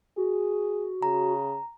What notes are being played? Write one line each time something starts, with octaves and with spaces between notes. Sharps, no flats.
F#4 G#4
C#3 A#5